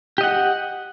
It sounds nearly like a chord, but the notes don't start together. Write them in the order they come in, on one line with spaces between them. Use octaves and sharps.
G4 D#5 F#5